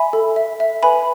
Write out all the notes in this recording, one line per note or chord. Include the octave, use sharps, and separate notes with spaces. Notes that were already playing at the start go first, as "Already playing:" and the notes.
Already playing: E5 G#5 B5
A4
E5
E5
B4 G#5 B5